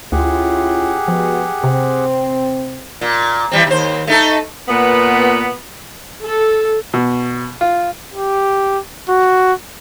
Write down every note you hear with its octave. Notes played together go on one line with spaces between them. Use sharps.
D2 C#4 E4 F4 G4 G#4 F#5
F3 G#3 B3 F#4
C3 C4
A#2
E3 G3 C4
D#2 C5
A3 D#4 A4
A#2 B3
A4
B2
F4
G4
F#4